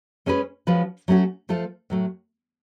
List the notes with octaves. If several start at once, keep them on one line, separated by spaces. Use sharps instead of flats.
G#3 C#4 G#4 B4
F3 G#3 C#4 F#4 B4
F#3 A3 C#4 F#4
F3 A3 F4 A4
A2 F#3 A3